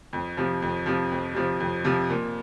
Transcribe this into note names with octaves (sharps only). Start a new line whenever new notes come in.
F2
C3 F3
F2
C3 F3
F2
C3 F3
F2
C3 F3
A#2